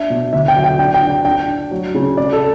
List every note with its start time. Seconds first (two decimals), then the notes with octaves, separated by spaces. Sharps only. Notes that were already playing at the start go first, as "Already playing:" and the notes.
Already playing: D4 E5
0.10 B2
0.33 D3 E5
0.48 G5
0.56 F#3
0.64 G5
0.79 D4 G5
0.94 G5
1.02 D4
1.10 G5
1.25 D4 G5
1.48 D4
1.71 F#3
1.95 C#3
2.17 C#3 D5
2.33 A4